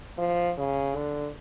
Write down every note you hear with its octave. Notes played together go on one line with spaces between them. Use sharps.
F3
C#3
D3